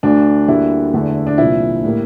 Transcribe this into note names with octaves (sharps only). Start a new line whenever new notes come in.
D2 D3 A3 D4
D2 D3 G3 A#3 E4
E2 D3 A3
D4
C2 A#2 F3 E4
A2 G3 A#3